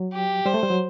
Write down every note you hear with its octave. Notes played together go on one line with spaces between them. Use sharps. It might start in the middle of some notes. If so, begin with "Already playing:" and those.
Already playing: F#3
G4
G3 C5
A3
G3
F#3